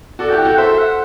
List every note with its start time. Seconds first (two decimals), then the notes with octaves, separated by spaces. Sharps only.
0.19 F#4 A4 D5
0.30 E4 G4 G5
0.39 F#5
0.45 F#4 A4 G5
0.58 A4 C5 E5
0.78 F#5